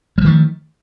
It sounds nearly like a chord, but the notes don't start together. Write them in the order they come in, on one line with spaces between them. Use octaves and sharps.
G3 F3 D#3 A3